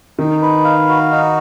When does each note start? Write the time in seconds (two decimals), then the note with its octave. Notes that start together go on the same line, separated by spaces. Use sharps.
0.19 D#3 D#4
0.42 B4
0.64 F5
0.88 F#4
1.11 D#4